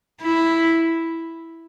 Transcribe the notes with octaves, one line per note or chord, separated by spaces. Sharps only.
E4